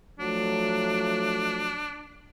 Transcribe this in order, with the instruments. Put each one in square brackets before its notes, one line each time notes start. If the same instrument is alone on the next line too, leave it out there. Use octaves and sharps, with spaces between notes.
[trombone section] F3 F#3 A3 [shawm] D4